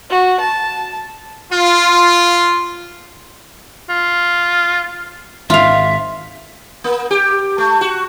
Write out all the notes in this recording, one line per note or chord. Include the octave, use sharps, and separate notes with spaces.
F#4
A5
F4
F4
G#1 G#2 F4 E5 F5
A#3
G4
A3
F#4